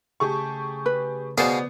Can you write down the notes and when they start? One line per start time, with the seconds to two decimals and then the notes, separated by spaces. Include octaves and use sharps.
0.20 C#3 A3 G4 G#4 A5 C#6
0.86 B4
1.38 B2 B3 G#4 C5 D5 F5